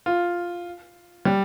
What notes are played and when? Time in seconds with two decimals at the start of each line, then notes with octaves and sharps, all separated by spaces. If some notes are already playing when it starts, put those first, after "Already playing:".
0.06 F4
1.25 G3